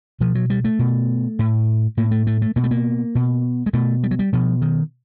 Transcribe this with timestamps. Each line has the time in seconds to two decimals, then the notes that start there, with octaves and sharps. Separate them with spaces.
0.20 B2 F3
0.35 F#3
0.50 G3
0.65 A3
0.79 B2
1.39 A2
1.97 A2 A#3
2.11 A3
2.27 A3
2.42 A3
2.56 B2 A#3
2.64 A3
2.71 A#3
3.15 B2
3.66 G#3
3.73 B2 A3
4.03 G3
4.11 F#3
4.19 G3
4.33 B2 F3
4.62 D#3